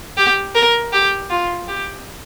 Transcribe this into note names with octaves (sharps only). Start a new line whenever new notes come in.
G4
A#4
G4
F4
G4